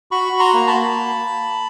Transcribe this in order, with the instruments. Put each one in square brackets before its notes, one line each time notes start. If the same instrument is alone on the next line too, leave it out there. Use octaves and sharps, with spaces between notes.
[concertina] F#4 B5 C#6
F#4
A#5 C6
A#3
A5 B5
A#3